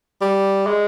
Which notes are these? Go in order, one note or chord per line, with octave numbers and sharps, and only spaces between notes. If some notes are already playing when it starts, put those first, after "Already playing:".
G3
G#3